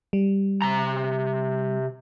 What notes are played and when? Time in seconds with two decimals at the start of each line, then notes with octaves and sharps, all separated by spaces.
0.13 G3
0.62 C3 A#5